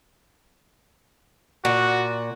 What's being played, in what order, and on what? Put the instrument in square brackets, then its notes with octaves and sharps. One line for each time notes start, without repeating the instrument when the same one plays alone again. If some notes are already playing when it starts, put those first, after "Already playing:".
[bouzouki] A#2 [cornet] F#4